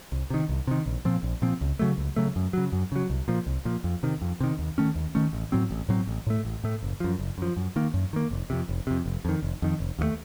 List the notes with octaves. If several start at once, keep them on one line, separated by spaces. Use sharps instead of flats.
C2
C3 D#3
C2
C3 D#3
A#1
A#2 F3 C4
A#1
A#2 F3 C4
C#2
C#3 F#3 A3
C#2
C#3 F#3 A3
F#2
C#3 F#3
F#2
C#3 F#3
C2
A#2 F3
C2
A#2 F3
F2
C3 D#3
F2
C3 D#3
D#2
D#3 A3 C#4
D#2
D#3 A3 C#4
A1
A2 F#3 C4
A1
A2 F#3 C4
A1
A2 A3
A1
A2 A3
F#1
F#2 F3
F#1
F#2 F3
F#2
D#3 A#3
F#2
D#3 A#3
F1
F2 C3
F1
F2 C3
F1
F2 D#3
F1
F2 D#3
F1
D#2 D#3 A3